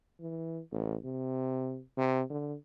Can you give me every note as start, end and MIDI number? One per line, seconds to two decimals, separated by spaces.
0.20 0.60 52
0.71 0.96 33
1.04 1.80 48
1.97 2.22 48
2.30 2.54 50